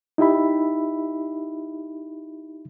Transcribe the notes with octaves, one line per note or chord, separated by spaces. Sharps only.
D#4 E4 G4 E5 B5